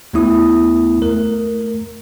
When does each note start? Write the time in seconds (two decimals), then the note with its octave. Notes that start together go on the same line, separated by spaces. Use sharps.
0.13 D#2 A3 B3 E4 D#6
1.02 A3 A#4